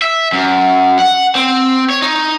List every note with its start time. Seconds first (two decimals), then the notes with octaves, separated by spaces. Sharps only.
0.02 E5
0.32 F#2
0.99 F#5
1.35 C4
1.90 C#5
2.02 D#4